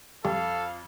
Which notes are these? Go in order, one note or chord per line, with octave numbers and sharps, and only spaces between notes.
F2 G3 A4 F5